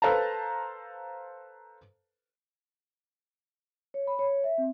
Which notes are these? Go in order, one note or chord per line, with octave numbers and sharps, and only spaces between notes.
A4 B4 C5 F5 A5 A#5
C#5
B5
C#5
E5
C4